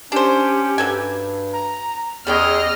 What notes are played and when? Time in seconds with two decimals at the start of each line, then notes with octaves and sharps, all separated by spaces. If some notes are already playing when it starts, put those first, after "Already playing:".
0.12 C#4 D4 G4 C5
0.78 G2 F#3 A4 G#5
1.53 A#5
2.27 E2 G3 C#4 G#4 D#5 G5 F6